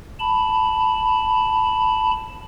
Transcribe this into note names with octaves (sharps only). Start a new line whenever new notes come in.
A5 B5